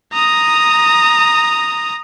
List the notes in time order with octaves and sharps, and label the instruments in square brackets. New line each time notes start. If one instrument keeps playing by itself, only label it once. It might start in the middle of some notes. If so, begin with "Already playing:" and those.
[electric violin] A#5 D#6